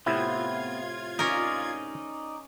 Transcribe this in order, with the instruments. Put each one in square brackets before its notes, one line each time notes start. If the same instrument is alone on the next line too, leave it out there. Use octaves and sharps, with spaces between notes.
[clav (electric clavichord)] A2 C3 E4 [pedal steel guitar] B3 C4 [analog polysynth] F4 G#6
[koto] C#4 A#4 [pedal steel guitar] D#4 D5